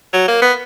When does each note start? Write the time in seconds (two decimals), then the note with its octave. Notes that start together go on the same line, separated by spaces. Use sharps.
0.13 F#3
0.28 A#3
0.42 B3